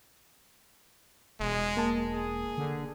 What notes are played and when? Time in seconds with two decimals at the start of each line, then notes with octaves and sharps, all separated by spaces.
1.40 E1 G#3
1.77 A#3 A5
2.14 G#4
2.58 D3